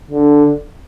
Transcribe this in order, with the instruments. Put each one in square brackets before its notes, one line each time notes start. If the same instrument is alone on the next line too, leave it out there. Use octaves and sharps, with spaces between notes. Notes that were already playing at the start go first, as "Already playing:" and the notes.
[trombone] D3